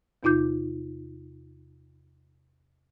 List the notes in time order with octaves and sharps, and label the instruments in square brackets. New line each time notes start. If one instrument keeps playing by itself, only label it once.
[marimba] E2 C3 D#4 F4 D6 G6